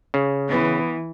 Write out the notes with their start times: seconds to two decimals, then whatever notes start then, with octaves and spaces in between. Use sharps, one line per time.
0.14 C#3
0.49 E3 B3